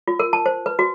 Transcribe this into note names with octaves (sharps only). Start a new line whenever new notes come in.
F4
A#4
A5
C5
B4
F#4